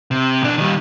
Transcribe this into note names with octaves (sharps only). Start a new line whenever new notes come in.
C3
B1 D4
D#3 G3